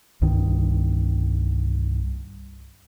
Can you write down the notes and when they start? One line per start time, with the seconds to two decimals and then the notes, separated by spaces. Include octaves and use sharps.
0.22 C2 G2 D#3